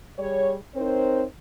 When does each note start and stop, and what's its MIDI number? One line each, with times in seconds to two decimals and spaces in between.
0.19 0.55 55
0.19 0.55 68
0.19 0.55 73
0.75 1.24 60
0.75 1.24 63
0.75 1.24 70
0.75 1.24 72
0.75 1.24 73